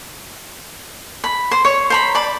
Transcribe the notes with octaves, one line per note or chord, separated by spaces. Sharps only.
B5
C5
C#5
C5 A#5 B5
D5 B5